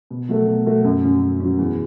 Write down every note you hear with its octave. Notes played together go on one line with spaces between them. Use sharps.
B2
F#3 A3 F#4 A4
B2
F#3 A3 F#4 A4
F#2
F#3 C#4
F#2
F#3 C#4
E2